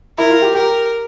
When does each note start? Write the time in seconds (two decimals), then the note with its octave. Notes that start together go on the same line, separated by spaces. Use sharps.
0.18 E4 A#4
0.30 F4
0.42 G4
0.54 G4 A#4